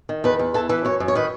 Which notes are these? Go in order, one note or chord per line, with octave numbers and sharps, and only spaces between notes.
D#3
E2 B4
E2
E3 A4
E3 B4
F#2 C#5
F#2
C#5
D#3 B4